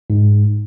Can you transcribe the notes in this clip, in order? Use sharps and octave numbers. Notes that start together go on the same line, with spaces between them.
G#2